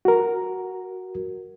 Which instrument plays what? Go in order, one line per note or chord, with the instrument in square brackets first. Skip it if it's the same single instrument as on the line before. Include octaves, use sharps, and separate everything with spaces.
[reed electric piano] F#4 A#4